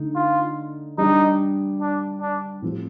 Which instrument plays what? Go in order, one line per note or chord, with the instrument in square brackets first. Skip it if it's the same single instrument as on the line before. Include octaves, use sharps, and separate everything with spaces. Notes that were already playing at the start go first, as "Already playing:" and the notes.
Already playing: [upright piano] D3 A3 D#4
[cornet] F4
[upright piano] G3 D4 G4 [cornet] D#4
[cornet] D4
D4
[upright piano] A2 F3 C4 G4